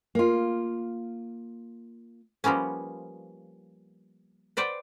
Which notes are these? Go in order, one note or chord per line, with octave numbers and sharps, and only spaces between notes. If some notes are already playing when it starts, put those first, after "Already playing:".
A#3 F4
F3 G3 A#3 B3 C#4
B4 C5 D5 F#5 G5